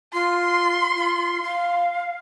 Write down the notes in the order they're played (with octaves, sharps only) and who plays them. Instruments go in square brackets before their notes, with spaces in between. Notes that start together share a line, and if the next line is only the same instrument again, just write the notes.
[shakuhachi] F4 [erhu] C6
[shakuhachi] F4
F5